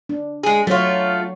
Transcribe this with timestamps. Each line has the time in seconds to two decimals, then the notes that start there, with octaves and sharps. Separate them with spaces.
0.09 D4
0.43 G#3 G#4
0.67 F#3 A3 F4 C#5